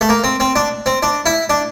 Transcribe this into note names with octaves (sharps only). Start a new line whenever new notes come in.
A3
A#3
C4
C4
D4
C4
D4
E4
D4